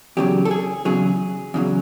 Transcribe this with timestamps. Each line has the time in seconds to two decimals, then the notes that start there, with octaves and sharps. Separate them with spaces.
0.17 E2 C#3 F#3 G4
0.45 A4
0.51 G#4
0.85 E2 C#3 F#3 G#4
1.54 E2 C#3 F#3